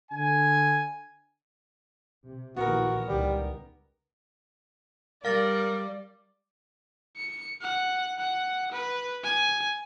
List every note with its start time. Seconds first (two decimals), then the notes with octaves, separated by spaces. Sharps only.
0.12 D3 G#5
2.25 C3
2.56 A#1 D#2 E3 B3 F#4 A#4
3.07 C#2 D#3 G3
5.25 G3 A#4 D5 F5 A6 A#6
7.16 C#7
7.61 F#5
8.19 F#5
8.72 B4
9.24 G#5